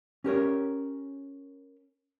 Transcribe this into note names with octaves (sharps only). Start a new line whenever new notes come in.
C#4 G4 A#4 C#5